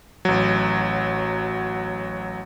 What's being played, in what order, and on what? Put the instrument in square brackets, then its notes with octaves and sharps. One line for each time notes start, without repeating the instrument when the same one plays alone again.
[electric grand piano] A1 F#3